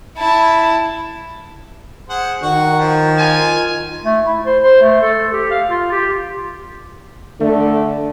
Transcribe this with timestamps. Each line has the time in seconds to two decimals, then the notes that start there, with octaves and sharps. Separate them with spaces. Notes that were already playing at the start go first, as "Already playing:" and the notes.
0.18 E4 A5
2.09 G#4 C5 F#5
2.42 D#3 F#4
2.79 F3
3.18 F4 G#5
4.04 A3
4.25 E4
4.46 C5
4.63 C5
4.82 A3
5.02 A4
5.32 G4
5.51 F5
5.69 F4
5.92 G4
7.40 D3 A3